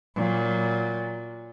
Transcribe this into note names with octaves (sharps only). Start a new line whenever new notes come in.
A#2 F#3